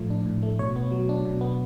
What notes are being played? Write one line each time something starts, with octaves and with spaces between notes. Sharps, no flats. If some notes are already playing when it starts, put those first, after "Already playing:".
Already playing: A2 F3 A3
D4
A2
A3
B2 C#5
B3
F#3
D4
B2
B3